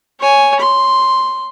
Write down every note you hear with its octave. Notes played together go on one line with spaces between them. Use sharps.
C#5 G#5
C6